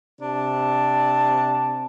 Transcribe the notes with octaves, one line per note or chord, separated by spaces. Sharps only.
C3 D4 A5